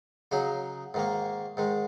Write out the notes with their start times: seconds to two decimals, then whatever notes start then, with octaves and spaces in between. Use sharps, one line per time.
0.31 C#3 F#3 D#4 G#4 D#5
0.94 G#2 D#3 A#3
1.57 G#2 D#3 G#3